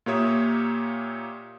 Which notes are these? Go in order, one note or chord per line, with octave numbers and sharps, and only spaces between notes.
A#2 A#3 G4 C#5 E5 D#6